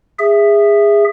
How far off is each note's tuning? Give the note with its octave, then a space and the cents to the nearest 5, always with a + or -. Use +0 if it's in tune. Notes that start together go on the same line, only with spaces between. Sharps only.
G#4 -20 E5 +5